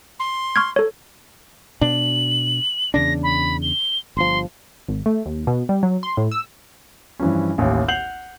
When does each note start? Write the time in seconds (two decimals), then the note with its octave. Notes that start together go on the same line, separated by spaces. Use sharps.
0.19 C6
0.56 C#6 F6 G#6
0.76 A4 C#5
1.81 B2 D4 F#7
2.94 E2 C#3 D4 A#6
3.23 B5
3.62 G7
4.17 G1 F3 C6
4.88 G#1
5.06 A3
5.26 D#2
5.47 B2
5.69 G3
5.83 F#3
6.03 C6
6.17 A2
6.31 E6
7.20 G2 E3 F3 C#4
7.58 A1 D#2
7.88 F#5 G6 C7 F7 F#7